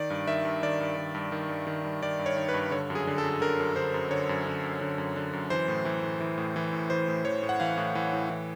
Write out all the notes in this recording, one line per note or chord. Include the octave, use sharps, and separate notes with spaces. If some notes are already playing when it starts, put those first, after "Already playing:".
Already playing: D#3 D5
G2
D#3 E5
G2
D#3 D5
G2
D#3
G2
D#3
G2
D#3
G2
D#3 D5
G2
C#5
D#3
B4
G2
D3 C#5
F#2
G#4
D3
A4
F#2
D3 A#4
F#2
D3 C5
F#2
D3 C#5
F#2
D3
F#2
D3
F#2
D3
F#2
E3 C5
A2
E3
A2
E3
A2
E3
A2
E3 C5
A2
E3 C#5
A2
F#5
E3 F5
A2
E3
A2
E3